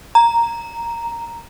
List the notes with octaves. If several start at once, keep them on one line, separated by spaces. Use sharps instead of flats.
A#5